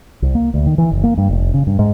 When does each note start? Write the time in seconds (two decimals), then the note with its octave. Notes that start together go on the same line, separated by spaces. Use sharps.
0.22 C2
0.35 A#3
0.54 D2
0.66 D#3
0.78 E3
0.91 F#1
1.03 A#3
1.18 G2
1.29 F1
1.54 C#3
1.67 G2
1.79 G#2